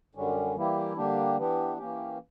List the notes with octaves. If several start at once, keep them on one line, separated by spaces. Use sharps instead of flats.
F#2 D3 G3 C#4
E3 G3 A#3 E4 G4
D3 G3 A#3 D4 G4
E3 B3 D4 G4
E3 A#3 C#4 G4